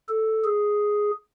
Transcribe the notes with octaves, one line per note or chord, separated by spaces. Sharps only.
A4
G#4